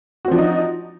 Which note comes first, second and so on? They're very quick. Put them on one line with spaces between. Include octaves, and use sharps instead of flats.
F#4 C4 F3 D4 D#4